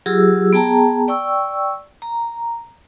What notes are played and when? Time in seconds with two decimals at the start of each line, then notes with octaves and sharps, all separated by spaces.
0.06 F#3 F4 G4 G#4 E6
0.53 B3 G#4 G5 A5 A#5
1.08 D5 G5 C#6 E6
2.02 A#5